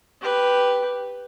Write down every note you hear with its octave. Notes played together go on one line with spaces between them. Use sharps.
G4 B4